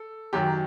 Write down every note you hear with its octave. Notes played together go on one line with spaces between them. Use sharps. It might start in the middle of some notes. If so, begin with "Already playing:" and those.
Already playing: A4
F#2 D#3 F#3 G4